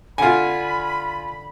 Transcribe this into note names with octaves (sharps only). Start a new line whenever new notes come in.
D3 F4 G#5 B5